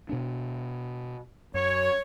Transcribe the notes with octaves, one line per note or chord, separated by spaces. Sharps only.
B2 B3 D4
F#2 C#5